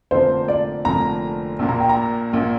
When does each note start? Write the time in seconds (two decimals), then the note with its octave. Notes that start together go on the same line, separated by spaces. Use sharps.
0.11 F1 F2 D3 F3 A#3 C5
0.48 D5
0.85 F1 F2 D3 F3 A#3 A#5
1.59 A#1 A#2 A#3
1.69 A#5
1.80 G5
1.89 A#5
2.33 A#1 A#2 A#3